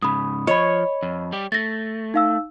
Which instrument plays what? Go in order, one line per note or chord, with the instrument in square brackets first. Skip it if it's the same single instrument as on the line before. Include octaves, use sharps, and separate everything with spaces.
[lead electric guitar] G#2 C#3 [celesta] B5 D#6
[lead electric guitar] F3 [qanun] C#5 [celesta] D#5 B5
[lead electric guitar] F2
G3 G4
[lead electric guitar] A3 [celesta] A6 A#6
[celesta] D#4 F5 E6